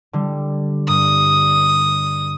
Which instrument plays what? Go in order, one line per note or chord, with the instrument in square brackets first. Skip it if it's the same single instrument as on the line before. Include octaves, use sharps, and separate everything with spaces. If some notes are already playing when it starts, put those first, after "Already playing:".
[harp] D3 G3
[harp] G2 [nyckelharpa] D#6